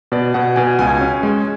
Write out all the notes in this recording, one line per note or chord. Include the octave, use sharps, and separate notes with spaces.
B2 D5
B2 F#5
B2 G#5
C#2 G#5
C#4
G#3